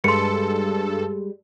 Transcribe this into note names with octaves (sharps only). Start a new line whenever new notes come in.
G2 G3 G#3 A4 B4 C6 C#7